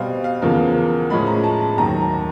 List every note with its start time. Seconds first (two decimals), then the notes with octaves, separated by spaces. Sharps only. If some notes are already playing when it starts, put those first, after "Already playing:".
Already playing: B2 G3 C4 F5
0.24 F5
0.42 E2 C#3 F3 A#3
1.10 A2 F3 G#3 C#4 B5
1.27 A#5
1.44 A5
1.61 A5
1.77 D#2 D#3 F#3 A#5
2.01 A5